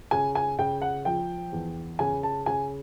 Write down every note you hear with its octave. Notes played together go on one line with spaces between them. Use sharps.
C#3 G#5
G#5
C#3 G5
F#5
F3 G5
E2
C#3 G#5
A5
C#3 G#5